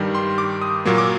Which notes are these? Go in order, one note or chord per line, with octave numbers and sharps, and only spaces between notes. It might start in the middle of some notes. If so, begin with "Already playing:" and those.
Already playing: G2 D#3 G3
C6
D6
D#6
A#2 F#3 A#3
D6